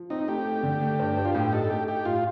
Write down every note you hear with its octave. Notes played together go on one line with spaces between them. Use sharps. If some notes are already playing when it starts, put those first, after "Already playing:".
Already playing: F3
C4 D#4
A3 G4
A3
D3
A3
G2
G2
F4
A2 G4
D#4 A4
A3 G4
D#4 G4
A2 F4